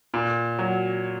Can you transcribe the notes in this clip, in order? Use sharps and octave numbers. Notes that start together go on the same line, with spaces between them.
A#2
F#3